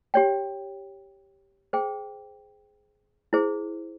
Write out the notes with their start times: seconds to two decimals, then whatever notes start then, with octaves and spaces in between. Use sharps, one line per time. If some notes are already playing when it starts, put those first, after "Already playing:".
0.14 G4 C#5 G5
1.73 G#4 C5 G5
3.33 E4 G#4 C5